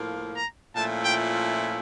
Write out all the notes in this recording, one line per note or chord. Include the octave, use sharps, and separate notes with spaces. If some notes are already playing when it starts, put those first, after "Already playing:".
Already playing: A2 F3 A#3
A#5
A#2 F3 A3 C#4 E4 A5
G5